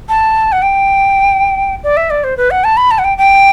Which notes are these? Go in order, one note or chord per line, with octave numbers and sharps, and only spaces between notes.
A5
F#5
G5
D5
E5
D5
C5
B4
F#5
A5
B5
A5
F#5
G5
G5